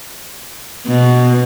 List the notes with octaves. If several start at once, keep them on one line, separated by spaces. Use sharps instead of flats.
B2